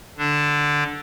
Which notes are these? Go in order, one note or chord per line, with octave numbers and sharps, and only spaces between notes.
D3 D4